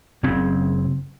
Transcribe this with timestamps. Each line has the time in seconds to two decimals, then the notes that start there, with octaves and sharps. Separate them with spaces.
0.23 F#1 C#3 C4